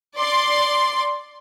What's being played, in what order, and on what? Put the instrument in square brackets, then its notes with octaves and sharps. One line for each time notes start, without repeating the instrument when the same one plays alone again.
[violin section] D5 C6